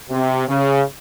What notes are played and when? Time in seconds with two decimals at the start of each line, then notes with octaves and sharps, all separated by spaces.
0.10 C3
0.48 C#3